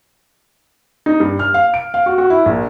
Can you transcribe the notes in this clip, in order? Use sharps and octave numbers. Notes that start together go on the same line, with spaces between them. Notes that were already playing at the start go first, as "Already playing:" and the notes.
D#4
G2
F6
F5
D7
F5
F#4
F#4
E4
A#1